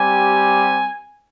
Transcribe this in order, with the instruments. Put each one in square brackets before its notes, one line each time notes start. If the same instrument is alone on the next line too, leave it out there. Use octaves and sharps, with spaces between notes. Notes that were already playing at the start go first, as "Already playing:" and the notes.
Already playing: [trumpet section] G3 C4 G4 G#5